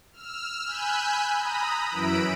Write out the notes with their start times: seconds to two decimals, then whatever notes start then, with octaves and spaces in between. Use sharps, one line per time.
0.12 E6 F6
0.64 G#5 B5 E6 F#6 G6
1.36 A#5 B5 D#6
1.89 F#2 E3 B5 E6 D7